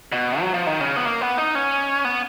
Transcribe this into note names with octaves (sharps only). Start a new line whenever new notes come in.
B2
F#3
F3
D#3
C#3
B3
A#3
B3
D#4
C#4
B3